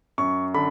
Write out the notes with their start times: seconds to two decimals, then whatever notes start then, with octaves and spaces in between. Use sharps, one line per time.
0.18 F#2 C#6
0.54 D3 B5